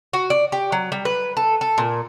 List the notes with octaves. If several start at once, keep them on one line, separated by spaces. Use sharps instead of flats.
F#4
D5
G4
F#3
G3
B4
A4
A4
A#2